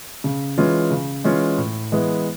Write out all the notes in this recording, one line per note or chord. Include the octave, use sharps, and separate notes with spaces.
C#3
E3 G#3 C#4 F4
C#3
E3 G#3 C#4 F4
A2
E3 G#3 B3 E4